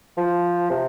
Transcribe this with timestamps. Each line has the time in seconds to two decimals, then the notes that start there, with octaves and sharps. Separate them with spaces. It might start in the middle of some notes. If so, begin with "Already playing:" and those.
0.17 F3
0.70 C3